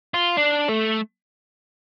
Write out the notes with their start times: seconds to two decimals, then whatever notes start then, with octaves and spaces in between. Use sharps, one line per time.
0.14 F4
0.38 D4
0.69 A3